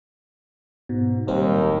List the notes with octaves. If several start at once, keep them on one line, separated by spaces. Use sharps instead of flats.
G#2 B2
D1 D#2 G3 C4 A#4